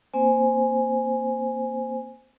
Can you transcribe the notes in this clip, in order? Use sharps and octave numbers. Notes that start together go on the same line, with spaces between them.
A#3 C4 C5 G#5